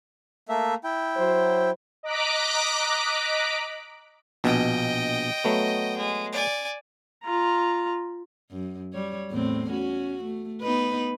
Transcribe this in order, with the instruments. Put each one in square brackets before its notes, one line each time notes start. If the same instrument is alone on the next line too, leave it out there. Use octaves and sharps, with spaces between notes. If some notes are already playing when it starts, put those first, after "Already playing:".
[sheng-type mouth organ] A3 A#3 E5
E4 G5
[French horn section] F#3 C5
[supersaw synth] D#5 A#5 D6 F#6 B6 D7
[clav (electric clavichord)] A#1 B2 [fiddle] D#5 G5
[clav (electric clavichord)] F#3 A3 B3
[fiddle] G#3
D5 G#5
[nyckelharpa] F4 A#5
[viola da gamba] F#2
G3 C#5
E2 A2 C4
C#4 F#4
A3
B3 D#4 B4